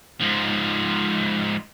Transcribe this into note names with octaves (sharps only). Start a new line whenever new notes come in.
G#2 F3